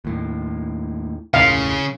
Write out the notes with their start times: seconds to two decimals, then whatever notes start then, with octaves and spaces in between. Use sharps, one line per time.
0.05 D#2 A2
1.34 E1 C#2 A2 C#3 F5